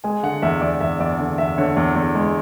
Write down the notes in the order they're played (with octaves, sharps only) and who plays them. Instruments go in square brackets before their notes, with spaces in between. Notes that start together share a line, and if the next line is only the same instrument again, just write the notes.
[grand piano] G#3 G#5
D3 F#5
E2 E5
E2 D5
E2 E5
E2 D5
D3
E2 E5
D3 C#5
E2
E2
G#3